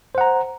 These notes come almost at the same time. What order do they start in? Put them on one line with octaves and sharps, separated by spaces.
C5 F#5 A#5